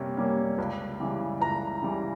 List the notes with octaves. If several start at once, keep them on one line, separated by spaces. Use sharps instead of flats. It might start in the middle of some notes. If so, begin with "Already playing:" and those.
Already playing: C3 G3 A#3 C#4
G3 A#3 C#4
C#2
C#3 E3 G3
C#2 A#5
C#3 E3 G3